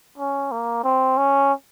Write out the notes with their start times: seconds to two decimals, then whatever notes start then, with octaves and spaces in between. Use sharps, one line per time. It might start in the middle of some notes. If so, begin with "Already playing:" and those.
0.18 C#4
0.52 A#3
0.84 C4
1.18 C#4